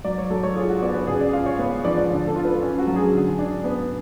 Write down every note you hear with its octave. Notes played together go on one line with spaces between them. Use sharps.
F#3 D5
C#5
F#3 A4
C#5
F4 G#4
F#4
B3 D5
B4
C#3 G#4
D5
F4 F5
C#5
B3 B4
F3 D5
D5
D3
A4
F4
B4
C#4
F#4
F#3
G#4
D3
D4
B3